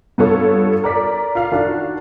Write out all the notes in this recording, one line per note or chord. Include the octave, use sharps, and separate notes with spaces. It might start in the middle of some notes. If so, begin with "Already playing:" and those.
G2 B3 F4 A4 C#5
A#4 D5 B6
F4 F5
D#3 D4 F#4